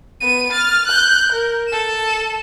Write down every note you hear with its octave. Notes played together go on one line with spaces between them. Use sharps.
B3 D#7
F6 A6
F#6 G6
A#4
A4 E7